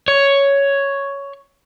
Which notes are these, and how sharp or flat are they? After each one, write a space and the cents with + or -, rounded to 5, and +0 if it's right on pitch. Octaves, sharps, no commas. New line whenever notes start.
C#5 +5